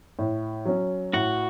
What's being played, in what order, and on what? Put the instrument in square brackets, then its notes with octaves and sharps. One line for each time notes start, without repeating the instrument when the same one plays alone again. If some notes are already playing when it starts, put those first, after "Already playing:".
[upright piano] A2
F#3 C#4
[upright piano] A2 [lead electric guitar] F#4